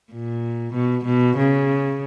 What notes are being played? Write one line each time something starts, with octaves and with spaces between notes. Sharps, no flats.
A#2
B2
B2
C#3